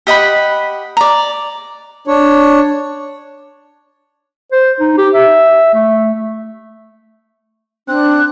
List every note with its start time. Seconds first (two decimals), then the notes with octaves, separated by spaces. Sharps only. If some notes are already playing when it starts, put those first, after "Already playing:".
0.07 G4 D#5 F#5 B5
0.97 D5 A#5
2.07 D4 C#5
4.52 C5
4.80 D#4
4.98 G4
5.15 E5
5.74 A3
7.88 C4 D4 F#6